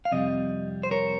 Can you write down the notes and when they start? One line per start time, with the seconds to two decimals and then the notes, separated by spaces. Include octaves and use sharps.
0.05 F5
0.12 F2 C3 G3 D#5
0.83 C5
0.91 A#4 C#5